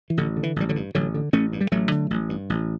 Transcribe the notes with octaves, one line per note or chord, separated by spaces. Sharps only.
E3
A1 D3
D3
E3
A1 G3
D3 F#3
G2
A1 D3 F#3
D3
A1 A3 C#4
G2
G3
A1 F#3 A3
D3
A1
G2
A1